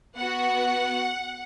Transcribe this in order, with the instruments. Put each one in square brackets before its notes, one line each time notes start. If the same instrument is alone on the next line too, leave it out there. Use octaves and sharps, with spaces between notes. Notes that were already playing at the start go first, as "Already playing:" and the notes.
[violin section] B3 F#4 F#5